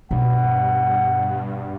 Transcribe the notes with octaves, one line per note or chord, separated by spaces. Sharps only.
G2 B2 F#5